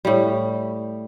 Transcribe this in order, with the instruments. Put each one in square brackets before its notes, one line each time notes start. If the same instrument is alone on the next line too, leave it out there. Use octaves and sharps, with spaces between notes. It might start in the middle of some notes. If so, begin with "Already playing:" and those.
[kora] A2 G3